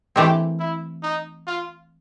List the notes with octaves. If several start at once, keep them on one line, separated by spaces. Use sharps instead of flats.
E3 A3 C4 G4
E4
D#4
F4